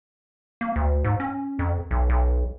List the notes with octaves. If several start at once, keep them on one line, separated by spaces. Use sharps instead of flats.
A#3
D2
G#2
C#4
F2
B1
B1